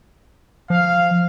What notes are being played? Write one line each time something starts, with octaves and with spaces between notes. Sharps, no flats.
F3 F5